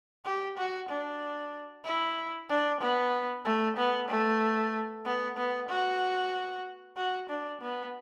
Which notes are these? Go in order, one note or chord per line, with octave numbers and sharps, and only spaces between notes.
G4
F#4
D4
E4
D4
B3
A3
B3
A3
B3
B3
F#4
F#4
D4
B3